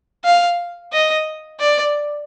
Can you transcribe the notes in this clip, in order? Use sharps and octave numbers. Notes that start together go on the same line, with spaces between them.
F5
D#5
D5